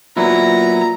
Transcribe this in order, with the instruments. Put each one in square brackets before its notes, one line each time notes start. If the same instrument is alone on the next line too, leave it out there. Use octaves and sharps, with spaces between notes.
[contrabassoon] A#2 [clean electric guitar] F#3 B3 E4 [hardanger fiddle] A#5